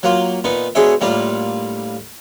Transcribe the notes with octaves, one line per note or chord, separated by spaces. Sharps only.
F#3 A#3 F4
A#2 B3 D#4
B2 G#3 D4 G#4 C#5 E5
A2 G3 A#3 D4 F4